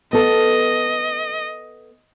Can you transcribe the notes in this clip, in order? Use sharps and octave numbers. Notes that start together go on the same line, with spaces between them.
B3 A4 D#5